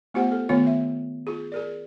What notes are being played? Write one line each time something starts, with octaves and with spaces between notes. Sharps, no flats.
A3 B3 F4 G4 C5 F#5
A4
D#3 A3 B3 F4 C#5
E5
F4 G#4
G#4 A#4 D5